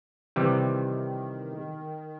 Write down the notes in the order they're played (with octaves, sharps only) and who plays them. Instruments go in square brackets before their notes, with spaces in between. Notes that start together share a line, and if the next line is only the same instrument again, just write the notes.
[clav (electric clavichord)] C3 E3 G3 [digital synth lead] D#3